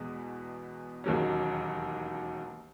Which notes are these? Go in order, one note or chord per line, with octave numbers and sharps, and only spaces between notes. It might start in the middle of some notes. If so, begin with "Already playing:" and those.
Already playing: E2 B2 G#3
E1 D#2 D#3 F#3 C#4